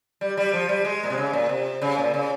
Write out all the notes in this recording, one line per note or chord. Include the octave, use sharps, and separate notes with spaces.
G3
G3
F3
G3
G#3
A#2
C3
C#3
A#2
C3
C#3
A#2
C#3